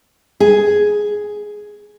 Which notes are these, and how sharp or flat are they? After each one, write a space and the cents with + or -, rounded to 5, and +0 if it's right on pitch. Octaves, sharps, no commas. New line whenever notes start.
G#4 +5